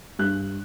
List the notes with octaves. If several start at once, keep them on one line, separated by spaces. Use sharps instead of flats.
G2 F#6